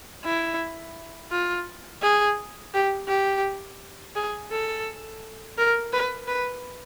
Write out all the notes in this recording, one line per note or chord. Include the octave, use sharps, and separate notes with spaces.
E4
F4
G#4
G4
G4
G#4
A4
A#4
B4
B4